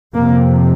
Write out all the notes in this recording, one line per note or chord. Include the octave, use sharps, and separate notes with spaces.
F2 C3 A#3